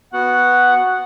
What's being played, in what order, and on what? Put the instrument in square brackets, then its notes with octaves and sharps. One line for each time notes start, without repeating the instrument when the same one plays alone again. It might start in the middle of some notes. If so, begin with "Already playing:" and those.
[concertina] B3 F#4 [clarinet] F#5